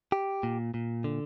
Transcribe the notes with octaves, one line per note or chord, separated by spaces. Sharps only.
G4
A#2
A#2
D3